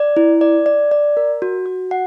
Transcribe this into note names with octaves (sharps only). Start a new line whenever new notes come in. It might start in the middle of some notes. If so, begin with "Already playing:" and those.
Already playing: D5
E4
D5
D5
D5
A#4
F#4
F#4
F#5